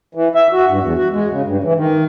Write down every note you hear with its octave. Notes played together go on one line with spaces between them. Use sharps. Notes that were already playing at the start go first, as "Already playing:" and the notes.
E3
E5
F#4
G2
E2
F#4
G#3
C#3
G2
E3
D#3